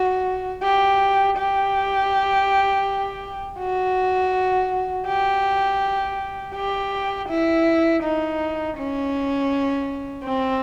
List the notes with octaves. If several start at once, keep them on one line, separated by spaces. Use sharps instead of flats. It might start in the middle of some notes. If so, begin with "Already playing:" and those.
Already playing: F#4
G4
G4
F#4
G4
G4
E4
D#4
C#4
C4